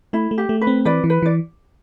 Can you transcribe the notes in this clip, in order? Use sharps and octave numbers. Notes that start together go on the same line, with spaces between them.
A3 E4
A3
G4
A3
B4
C4
E3 B4 D5
E3
B4
E3 D5